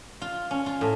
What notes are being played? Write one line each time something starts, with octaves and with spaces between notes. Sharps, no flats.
F4
C#4
F4
A2